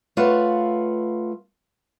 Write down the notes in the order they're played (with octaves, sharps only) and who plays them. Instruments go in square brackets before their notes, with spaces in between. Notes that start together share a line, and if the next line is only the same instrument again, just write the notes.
[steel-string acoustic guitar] A3 F4 B4 C#5 F5 F#5